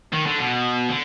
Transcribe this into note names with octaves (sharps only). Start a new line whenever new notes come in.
D#3
D3
B2
D3